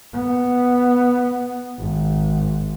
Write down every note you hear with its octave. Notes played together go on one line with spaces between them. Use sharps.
B3
G#1